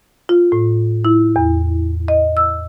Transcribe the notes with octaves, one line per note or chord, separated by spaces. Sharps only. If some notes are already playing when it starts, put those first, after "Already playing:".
F4
A2
E4
E2
D#5
E6